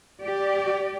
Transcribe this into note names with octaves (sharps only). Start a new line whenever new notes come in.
G4 D5